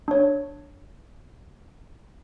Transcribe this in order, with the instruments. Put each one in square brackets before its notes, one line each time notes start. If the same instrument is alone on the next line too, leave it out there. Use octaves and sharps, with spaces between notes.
[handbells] D4 C#5